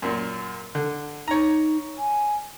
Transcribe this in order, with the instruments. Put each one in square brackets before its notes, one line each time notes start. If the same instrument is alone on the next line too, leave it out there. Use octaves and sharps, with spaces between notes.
[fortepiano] F#2 A#2
D3
[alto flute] D#4 [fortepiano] C#5 A#5
[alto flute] G#5